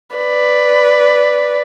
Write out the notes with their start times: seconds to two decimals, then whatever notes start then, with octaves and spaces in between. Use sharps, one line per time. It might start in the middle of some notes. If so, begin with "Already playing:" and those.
0.17 B4 D5